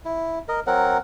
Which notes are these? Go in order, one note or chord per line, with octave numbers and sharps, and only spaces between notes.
E4
A#4 D#5
F#3 C4 A#4 F#5